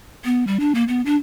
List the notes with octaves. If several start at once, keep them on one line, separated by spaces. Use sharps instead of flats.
B3
G3
D4
A#3
B3
D4